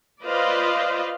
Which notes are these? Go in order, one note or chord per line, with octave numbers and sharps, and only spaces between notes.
F4 B4 C5 D5 D#5 F5